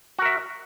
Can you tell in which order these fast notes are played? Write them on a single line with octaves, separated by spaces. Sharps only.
F#4 A#4 E5